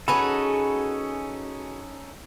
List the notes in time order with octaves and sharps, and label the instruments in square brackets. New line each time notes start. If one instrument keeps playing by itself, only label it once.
[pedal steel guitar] C#4 D#4 A4 [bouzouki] F#4 G#4 B4 [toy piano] B5